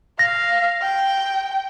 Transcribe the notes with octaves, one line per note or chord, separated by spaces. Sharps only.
F5 A#6
G5